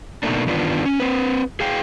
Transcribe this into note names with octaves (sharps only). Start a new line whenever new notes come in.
B2 D#3 F#3 A3 A#3 D4
E2 G2 D#3 B3 D4 F4
C#4
C4 B4
G#4 F5 G5